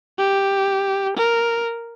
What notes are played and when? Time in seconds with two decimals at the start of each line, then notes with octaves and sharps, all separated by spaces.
0.19 G4
1.17 A#4